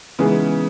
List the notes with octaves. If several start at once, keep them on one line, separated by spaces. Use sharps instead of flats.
C#3 E3 G#3 B3 D#4 G#4